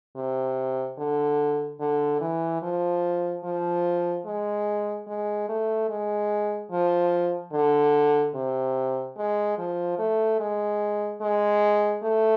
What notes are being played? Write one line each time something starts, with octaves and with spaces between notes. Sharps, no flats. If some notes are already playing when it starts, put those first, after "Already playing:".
C3
D3
D3
E3
F3
F3
G#3
G#3
A3
G#3
F3
D3
C3
G#3
F3
A3
G#3
G#3
A3